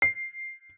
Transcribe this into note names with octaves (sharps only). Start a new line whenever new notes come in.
C7